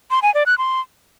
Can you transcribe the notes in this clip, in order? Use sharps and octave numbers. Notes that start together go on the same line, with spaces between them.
C6
G#5
D5
F#6
C6